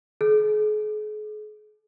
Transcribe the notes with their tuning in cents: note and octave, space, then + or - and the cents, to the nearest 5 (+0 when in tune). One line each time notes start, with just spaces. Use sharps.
G#4 +40